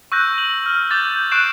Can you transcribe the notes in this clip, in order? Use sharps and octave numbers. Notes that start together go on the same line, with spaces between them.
C#6 E6 F#6 G6 A#6
F#7
F6
D6 G6 A6
G6
C#6 F#6 G6 C7 D7 E7